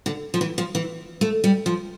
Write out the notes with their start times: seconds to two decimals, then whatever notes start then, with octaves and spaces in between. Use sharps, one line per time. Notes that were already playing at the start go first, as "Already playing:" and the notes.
0.06 D3
0.34 F3
0.41 E3
0.58 F3
0.75 E3
1.21 A3
1.44 G3
1.66 F3